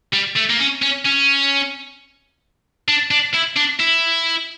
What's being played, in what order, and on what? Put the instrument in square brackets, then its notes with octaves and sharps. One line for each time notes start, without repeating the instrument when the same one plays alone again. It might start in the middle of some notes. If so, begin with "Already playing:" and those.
[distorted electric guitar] G3
A3
A#3
C#4
C#4
C#4
D4
D4
E4
D4
E4